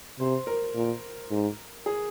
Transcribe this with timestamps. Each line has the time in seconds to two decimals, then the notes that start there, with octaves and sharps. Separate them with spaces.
0.19 C3 C5
0.47 A#4
0.75 A#2
1.31 G#2
1.86 G#4